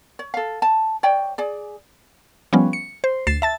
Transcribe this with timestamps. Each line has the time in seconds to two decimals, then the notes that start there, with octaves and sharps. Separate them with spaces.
0.19 C#5
0.34 A4 F5
0.62 A5
1.03 C#5 D5 G5
1.38 G#4 D5
2.53 F3 G3 B3 C#4
2.73 C#7
3.04 C5
3.27 D2 A6 C7 E7
3.42 E5 A5 A6